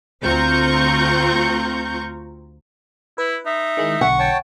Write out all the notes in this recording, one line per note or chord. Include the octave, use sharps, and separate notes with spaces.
D2 C4 F4 A#5 C#6 G6
E4 B4
D#4 E5
D#3 G#3 E4
B1 D3 F#5 C#6
C#5 G5 A5